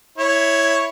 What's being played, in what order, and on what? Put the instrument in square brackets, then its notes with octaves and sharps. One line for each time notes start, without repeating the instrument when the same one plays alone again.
[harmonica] E4 C#5